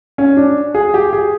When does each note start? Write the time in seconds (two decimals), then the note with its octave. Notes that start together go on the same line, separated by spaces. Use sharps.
0.18 C#4
0.37 D4
0.74 G#4
0.94 G4
1.13 G#4